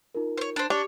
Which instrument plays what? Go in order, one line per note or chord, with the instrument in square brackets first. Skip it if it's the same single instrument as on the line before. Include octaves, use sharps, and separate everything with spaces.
[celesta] D#4 F4 A#4
[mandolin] C5 C#5
D4 C5
[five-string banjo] D4 [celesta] G4 [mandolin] C#5